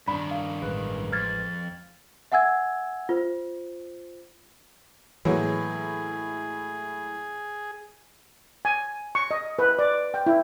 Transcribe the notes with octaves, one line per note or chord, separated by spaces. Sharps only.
G2 D#3 D4 B5
F5
A1 G#3 B4
F2 F6 G#6 A6
E5 F#5 G#5 E6 G#6
F4 C5
A2 E3 F#3 G#3 A#3 F#4 G#4 C#5
G#5
C#6
D#5
B4
D5
G5
E4